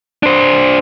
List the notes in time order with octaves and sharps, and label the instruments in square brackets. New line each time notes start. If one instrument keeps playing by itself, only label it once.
[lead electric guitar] D4 C5